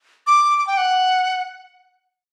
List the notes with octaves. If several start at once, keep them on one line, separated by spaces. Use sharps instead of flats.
D6
D6
G5
F#5